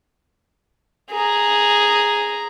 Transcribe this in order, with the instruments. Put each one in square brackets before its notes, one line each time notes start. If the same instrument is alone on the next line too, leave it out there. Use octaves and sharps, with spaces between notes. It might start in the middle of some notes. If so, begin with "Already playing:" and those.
[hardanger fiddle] G#4 A#5